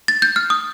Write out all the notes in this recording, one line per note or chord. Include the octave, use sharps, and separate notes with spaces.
A6
G6
F6
D#6